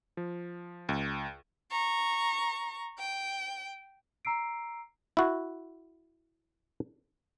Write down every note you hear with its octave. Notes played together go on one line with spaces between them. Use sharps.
F3
C#2
A#5 C#6
G5
A#5 E6 C7 D7
E4 F#4